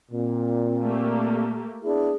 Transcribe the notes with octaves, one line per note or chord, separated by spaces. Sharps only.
A#2 C4
A3 A#3 G4
B3 D4 E4 G#4